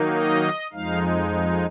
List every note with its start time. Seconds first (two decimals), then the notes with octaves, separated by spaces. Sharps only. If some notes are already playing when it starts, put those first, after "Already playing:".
Already playing: D#3 F#3 A#3 D#4
0.14 D#5
0.73 F2 F3 G#3 D#4 F5